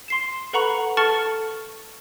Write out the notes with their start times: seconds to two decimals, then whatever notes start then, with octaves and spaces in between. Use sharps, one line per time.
0.08 C6 C7 E7
0.53 A4 B4 F#5 A#5 B5 C#6
0.97 A4 A5 C#6 F6 A6 C#7